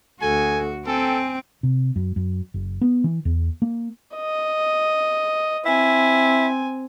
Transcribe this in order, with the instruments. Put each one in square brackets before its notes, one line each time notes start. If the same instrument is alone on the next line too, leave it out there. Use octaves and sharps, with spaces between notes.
[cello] D2 F#4 [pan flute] A4 [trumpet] G#5
[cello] C4 G5 [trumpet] A4 [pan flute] G#5
[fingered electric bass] C3
F#2
F#2
F#1
B3
E3
E2
A#3
[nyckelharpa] D#5
[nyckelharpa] C4 G#5 [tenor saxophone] E4